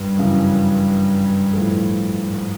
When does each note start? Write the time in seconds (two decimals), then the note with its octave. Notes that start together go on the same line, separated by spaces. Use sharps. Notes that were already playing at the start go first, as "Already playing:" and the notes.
Already playing: G2
0.17 F#2 C#3 E3
1.53 A2 F3 A3
2.22 G#2